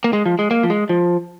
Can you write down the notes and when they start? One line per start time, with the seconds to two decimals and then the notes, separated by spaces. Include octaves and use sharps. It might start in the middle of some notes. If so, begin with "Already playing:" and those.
0.04 A#3
0.13 G#3
0.26 F3
0.39 G#3
0.51 A#3
0.63 F3
0.70 G#3
0.89 F3